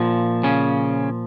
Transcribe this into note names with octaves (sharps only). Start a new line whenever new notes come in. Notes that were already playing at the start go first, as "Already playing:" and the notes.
Already playing: A#2 F3
C#3 C#4